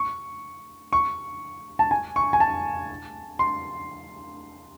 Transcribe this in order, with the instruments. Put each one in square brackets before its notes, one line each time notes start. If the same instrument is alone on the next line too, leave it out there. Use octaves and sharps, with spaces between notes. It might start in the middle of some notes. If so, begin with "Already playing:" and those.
Already playing: [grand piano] C#6
C#6
A5
G#5
C#6
G#5
A5
C6